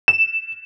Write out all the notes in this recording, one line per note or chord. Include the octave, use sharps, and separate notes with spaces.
E7